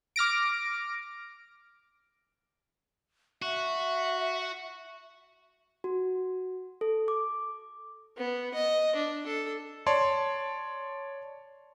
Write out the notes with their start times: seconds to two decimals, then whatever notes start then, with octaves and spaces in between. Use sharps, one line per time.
0.16 D6 F6 A#6 D7
3.42 F#4 E5
5.84 F#4
6.81 A4
7.08 D6
8.18 B3
8.54 D#5
8.96 D4
9.27 A4
9.87 C#5 D5 A5 C6